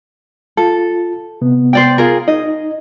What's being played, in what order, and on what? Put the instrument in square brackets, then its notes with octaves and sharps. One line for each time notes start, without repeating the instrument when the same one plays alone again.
[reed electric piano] F4 [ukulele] A4
[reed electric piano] C3 B3
[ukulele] C5 D5 G5
F4 G#4 A#4
[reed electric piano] D#4 [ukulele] D#5